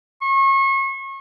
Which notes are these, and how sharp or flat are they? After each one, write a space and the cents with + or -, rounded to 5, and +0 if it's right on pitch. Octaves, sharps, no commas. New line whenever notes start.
C#6 -35